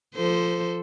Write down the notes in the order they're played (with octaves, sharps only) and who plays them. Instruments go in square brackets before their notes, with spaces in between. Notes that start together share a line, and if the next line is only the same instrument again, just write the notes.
[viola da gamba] F3 A4 C5